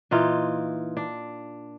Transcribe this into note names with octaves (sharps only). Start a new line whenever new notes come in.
A#2 E3 D#4 F4
D4